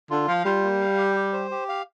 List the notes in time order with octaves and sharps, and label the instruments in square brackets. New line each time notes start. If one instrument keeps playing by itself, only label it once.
[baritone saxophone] D3 [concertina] F4
[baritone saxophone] F3 [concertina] F5
[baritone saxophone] G3 [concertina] F4
[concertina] A#3
F5
G4
G4
C5
G4
F5